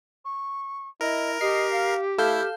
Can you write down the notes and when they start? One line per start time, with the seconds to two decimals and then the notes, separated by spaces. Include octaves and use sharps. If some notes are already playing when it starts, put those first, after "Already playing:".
0.25 C#6
1.01 E4 A#4 D#5
1.41 G4 D#5 C7
1.73 F5
2.18 A3 E4 A4 F5 G6